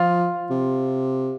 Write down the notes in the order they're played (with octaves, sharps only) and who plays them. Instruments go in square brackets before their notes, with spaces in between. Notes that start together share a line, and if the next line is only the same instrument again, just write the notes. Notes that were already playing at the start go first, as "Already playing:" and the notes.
Already playing: [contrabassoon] F3 [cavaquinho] F4
[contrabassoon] C3